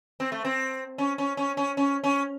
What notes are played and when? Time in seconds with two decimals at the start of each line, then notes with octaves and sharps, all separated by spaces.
0.20 C4
0.32 A3
0.45 C4
0.98 C#4
1.18 C#4
1.37 C#4
1.57 C#4
1.77 C#4
2.04 C#4